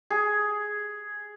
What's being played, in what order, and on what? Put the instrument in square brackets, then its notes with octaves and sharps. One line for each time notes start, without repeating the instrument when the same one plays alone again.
[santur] G#4